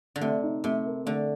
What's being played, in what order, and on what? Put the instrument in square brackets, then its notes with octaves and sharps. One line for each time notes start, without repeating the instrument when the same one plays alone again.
[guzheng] D3
[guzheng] C3 [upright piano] A3
[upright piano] D#4
[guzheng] C3 [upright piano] A3
[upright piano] A#4
[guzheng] D3 [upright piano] A3